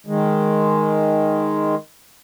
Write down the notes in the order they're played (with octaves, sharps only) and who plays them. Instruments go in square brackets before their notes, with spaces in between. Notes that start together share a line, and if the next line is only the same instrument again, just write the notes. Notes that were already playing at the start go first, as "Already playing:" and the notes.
[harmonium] D#3 G#3